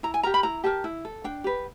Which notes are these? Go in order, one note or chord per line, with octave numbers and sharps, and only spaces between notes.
E4 A#5
G#5
G4 A#4 A#5
B5
E4 A#5
G4 A#4 A5
E4
A4
D4 G5
G4 B4